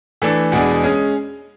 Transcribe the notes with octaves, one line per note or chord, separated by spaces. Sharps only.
E3 A3 D4 A4
E2 B2 G#3 D4 G#4
G#3 C#4 G#4